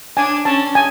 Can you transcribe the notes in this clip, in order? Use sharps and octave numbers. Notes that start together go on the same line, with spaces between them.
D4 G#5
C#4 A5
G#5